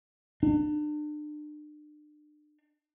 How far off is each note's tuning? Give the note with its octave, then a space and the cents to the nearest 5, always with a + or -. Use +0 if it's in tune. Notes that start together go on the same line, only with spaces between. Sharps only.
D4 +35